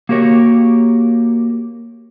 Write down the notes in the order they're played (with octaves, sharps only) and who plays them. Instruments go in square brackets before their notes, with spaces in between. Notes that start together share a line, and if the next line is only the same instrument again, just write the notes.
[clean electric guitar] A#3 F#4 G4 A#4 C#5